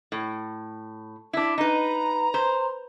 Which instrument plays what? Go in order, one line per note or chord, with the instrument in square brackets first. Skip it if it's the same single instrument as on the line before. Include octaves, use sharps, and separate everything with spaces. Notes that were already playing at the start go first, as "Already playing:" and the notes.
[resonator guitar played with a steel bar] A2
D4 E4
[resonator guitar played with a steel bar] D#4 B4 [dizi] A#5
[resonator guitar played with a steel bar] C5